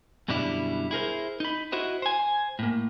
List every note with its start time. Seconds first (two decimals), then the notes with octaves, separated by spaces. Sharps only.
0.28 F#2 B2 D3 G3 D4 E4
0.91 E4 G#4 A#4 C5
1.40 D#4 B5
1.72 E4 F#4 C5 D#5
2.02 C5 G#5
2.59 A2 A#3